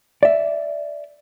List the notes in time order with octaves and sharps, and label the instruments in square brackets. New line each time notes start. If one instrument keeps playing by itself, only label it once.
[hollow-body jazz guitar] D5 E5